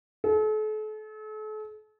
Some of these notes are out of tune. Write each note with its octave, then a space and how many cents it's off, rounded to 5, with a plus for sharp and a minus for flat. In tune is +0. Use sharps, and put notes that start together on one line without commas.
A4 -40